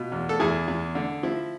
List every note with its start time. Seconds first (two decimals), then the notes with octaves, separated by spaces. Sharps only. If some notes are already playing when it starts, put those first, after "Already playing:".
Already playing: B2 F4
0.12 E2
0.29 A4
0.40 E2 E4 G#4
0.68 E2
0.95 D3
1.23 F3 E4